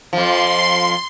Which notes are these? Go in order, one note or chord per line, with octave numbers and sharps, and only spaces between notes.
F2 F3 C6